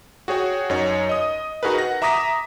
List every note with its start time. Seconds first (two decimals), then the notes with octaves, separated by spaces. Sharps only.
0.28 F#4 G#4 C#5 G5
0.70 F#2 D#4 C#5
1.09 D#5 D#6
1.63 D#4 F#4 G#4 A#4 B4
1.78 F#5 A#6
2.02 E5 A#5 D6 D#6 A#6 B6